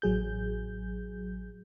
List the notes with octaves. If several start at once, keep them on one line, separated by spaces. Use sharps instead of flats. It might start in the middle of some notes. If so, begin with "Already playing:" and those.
A1 F#3 G#4 G6